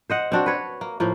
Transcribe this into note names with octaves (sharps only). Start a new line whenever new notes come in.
C5 D#5 F#5
C4 D4 F#4
B4 C#5
A#3
A2 F3 A#3